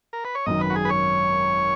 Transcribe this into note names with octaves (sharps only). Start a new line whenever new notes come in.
A#4
B4
C#5
G#1 F#2 D#3 D#5
B4
F#4
G#4
B4
C#5